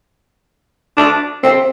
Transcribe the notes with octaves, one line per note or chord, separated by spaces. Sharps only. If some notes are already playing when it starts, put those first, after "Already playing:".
D4
C4